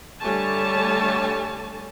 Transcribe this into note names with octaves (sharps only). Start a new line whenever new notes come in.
D3 G3 A3 C#5 G#5 A5